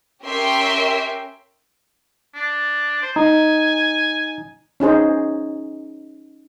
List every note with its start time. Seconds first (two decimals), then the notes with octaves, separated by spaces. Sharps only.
0.25 C#4 G4 A#4 E5 G5 C6
2.34 D4
3.02 C5
3.16 D#4 G#5
4.80 C#4 D#4 G#4 C5